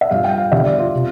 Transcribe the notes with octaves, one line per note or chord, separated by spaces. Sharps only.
E5
G2 F3 F5
G5
F5
E2 D3 G3 E5
D5
F4
C3